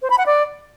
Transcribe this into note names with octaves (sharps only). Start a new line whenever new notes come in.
C5
B5
F#5
D5